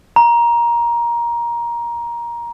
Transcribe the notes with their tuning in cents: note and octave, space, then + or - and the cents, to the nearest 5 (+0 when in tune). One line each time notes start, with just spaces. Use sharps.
A#5 +15